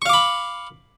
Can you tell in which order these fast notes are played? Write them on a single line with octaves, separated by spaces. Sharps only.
C#6 F5 D6 B5